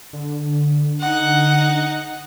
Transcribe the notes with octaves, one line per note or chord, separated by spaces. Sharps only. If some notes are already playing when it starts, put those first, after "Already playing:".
D3
D#4 F#5